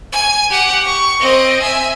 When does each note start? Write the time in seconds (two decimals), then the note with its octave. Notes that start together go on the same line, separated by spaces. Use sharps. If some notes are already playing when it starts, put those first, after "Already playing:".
0.12 G#5
0.50 G4 F#5
0.85 C#6
1.20 C4 D#5
1.62 E5 G#5